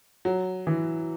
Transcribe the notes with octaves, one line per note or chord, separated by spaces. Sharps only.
F#3
E3